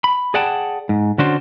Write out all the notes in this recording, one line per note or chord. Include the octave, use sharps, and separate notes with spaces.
B5
G#4 D5 F#5 G5 A5
G#2
D3 C#4 D4 F#4 C5